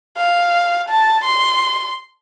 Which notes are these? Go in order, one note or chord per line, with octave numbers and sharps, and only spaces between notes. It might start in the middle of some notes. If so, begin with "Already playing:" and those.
F5
A5
C6